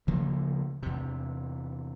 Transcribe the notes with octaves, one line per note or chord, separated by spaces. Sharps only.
D2 C#3 F3 A#3
E2 C3